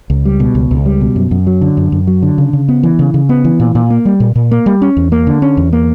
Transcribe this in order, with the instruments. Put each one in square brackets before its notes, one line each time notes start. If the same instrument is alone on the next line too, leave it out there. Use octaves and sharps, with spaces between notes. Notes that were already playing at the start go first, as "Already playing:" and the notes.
[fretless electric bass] C#2
G3
B2
C#2
C#2
G3
B2
F#2
F#2
F#3
D3
F#2
F#2
F#3
D3
C#3
C#3
B3
E3
C#3
C#3
B3
E3
A#2
A#2
A#3
G3
A#2
A#2
A#3
G3
C#4
E2
A#3
D3
C#4
E2
A#3